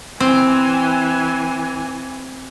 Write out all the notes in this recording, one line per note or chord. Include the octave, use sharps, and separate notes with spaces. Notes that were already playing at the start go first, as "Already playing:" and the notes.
E3 C4 G#5